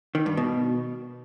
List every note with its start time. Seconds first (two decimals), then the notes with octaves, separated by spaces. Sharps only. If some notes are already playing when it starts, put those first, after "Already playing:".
0.15 D#3
0.26 G2
0.37 B2